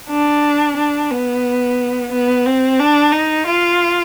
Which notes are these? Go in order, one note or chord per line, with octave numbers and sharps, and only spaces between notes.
D4
D4
B3
B3
C4
D4
D#4
F4